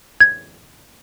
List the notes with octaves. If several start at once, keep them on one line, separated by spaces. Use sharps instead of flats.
G#6